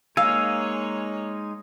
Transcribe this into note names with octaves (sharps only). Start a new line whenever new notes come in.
G#3 A#3 D#4 C#5 F5 G#5 E6